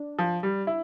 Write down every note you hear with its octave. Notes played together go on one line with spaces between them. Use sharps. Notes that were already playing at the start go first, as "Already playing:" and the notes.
Already playing: D4
F3
G3
E4